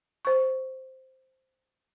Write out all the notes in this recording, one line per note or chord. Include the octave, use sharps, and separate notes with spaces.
C5 C#6